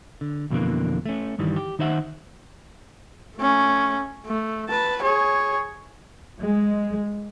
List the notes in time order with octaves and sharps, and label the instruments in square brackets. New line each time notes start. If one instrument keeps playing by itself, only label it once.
[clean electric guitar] D3
F2 B2 D3 E3 A#3
A3 C#4
G2 D#3 E3 G3
G4
D#3 D#4 C5 E5 F#5
[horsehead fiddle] A3 C#4
A3
B4 A5
G#4 C#5
[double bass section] G#3